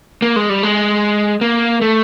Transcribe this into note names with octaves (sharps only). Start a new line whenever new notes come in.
A#3
G#3
G3
G#3
A#3
A3